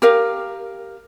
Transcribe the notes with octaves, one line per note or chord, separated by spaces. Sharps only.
G4 A#4 F5